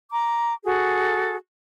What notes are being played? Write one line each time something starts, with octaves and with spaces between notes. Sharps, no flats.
A#5 D6
F#4 G#4 A4